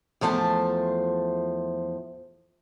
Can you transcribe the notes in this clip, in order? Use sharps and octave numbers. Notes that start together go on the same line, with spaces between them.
E2 F3 A3 C5 A5